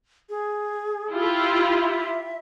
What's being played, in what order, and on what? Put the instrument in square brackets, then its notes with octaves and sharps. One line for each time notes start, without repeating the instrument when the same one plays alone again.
[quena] G#4
[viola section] E4 F4 G4
[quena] E5